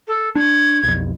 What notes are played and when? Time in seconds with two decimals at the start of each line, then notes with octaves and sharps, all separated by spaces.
0.08 A4
0.35 D4 G#6
0.83 B1 F2